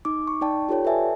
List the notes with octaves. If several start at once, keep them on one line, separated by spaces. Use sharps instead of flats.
D#4 D6
C#6
D#4 D5 G5 A5
F4 G4 A4 C#5 G5
A4 B4 D5 E5 G#5 A5